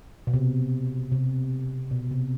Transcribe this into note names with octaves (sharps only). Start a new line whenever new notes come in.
B2
C3
C3
B2
C3